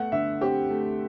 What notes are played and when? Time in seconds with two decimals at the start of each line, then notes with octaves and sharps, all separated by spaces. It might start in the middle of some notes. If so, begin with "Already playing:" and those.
Already playing: A3 B3 F#5
0.12 D3 E5
0.41 C4 G4
0.70 A3